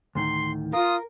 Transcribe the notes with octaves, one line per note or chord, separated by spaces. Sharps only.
D2 A2 D#3 C6
F4 A#4 D#6